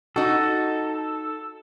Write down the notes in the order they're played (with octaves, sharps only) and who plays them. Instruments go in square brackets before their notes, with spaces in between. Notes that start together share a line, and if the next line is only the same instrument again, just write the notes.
[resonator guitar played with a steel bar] D#4 F#4 [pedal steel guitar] A4